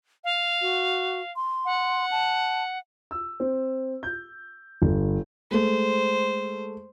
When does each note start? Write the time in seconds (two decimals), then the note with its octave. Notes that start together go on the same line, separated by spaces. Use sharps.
0.24 F5
0.61 F#4
1.36 C6
1.65 F#5
2.11 A5
3.11 E6
3.40 C4
4.03 G6
4.82 G1
5.51 G#3 A3 C5